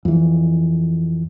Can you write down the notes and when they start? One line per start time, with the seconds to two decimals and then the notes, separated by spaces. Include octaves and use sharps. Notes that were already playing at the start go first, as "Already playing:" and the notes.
0.05 F2 E3